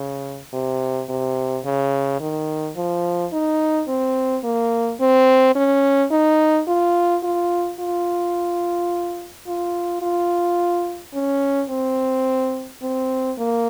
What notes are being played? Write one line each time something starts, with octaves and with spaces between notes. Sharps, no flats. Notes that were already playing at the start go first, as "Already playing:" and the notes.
Already playing: C#3
C3
C3
C#3
D#3
F3
D#4
C4
A#3
C4
C#4
D#4
F4
F4
F4
F4
F4
C#4
C4
C4
A#3